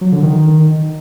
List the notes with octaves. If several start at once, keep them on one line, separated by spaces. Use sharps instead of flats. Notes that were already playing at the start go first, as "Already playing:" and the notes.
F#3
D3
D#3